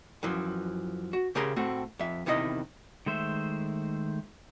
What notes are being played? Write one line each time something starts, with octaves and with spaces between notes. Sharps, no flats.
F#2 E3 F3
F#4
C#3 G4 G#4 A#4 A#5 C6
A2 A3 C4 F#4
F2 E5
E2 C3 D#3 E4 G4 D#5
D#3 G#3 A3 C5 E5